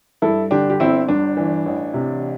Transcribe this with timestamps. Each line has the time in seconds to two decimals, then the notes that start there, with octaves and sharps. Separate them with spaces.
0.22 G2 E4 A4
0.51 D3 D4 G4
0.70 G4
0.80 G1 C4 E4
1.08 G2 D4
1.37 E3
1.66 A1
1.94 C3